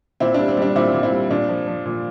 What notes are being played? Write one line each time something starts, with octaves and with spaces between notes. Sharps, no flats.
A#2 C4 E4
D4
G3
C4
G3 D4
A#2 C4 E4
A#2
C4 E4
G3
A#2 D4
F3
F3
A#2